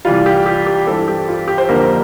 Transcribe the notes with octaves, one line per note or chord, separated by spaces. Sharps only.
C2 C3 E3 G3 F4
G4
G4
G4
G2 E3 G3 C4 A4
G4
F4
G4
C5
F2 D3 G3 A#3 A#4